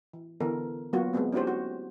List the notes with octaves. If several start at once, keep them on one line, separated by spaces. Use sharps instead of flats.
E3
D3 E3 B3 A4 A#4
F#3 A#3 B3 F4 F#4
G#3 A3 B3 C4
C#4 D#4 E4 F#4 G4 C5
F#4